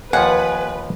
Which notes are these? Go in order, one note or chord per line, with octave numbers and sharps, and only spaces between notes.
D#2 F3 B4 F#5 G#5